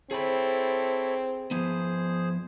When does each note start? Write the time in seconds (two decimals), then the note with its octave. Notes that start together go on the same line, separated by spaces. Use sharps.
0.11 C4 E4 G#4 A4 C#5 B5
1.51 F3 B3 G#4 C5